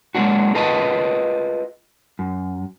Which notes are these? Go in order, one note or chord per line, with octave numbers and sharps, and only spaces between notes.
F#3 G#3 A#3 C#4 D4 F#4
F4 G#4 A#4 B4 D#5 A5
F#2